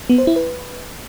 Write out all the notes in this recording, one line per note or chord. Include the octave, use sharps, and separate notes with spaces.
B3
C5
E4
B4